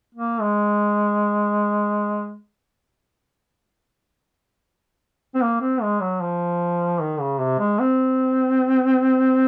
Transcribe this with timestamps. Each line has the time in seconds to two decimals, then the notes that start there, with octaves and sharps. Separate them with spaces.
0.15 A#3
0.41 G#3
5.35 C4
5.42 A#3
5.61 C4
5.82 G#3
6.01 F#3
6.21 F3
7.01 D#3
7.20 C#3
7.41 C3
7.59 G#3
7.80 C4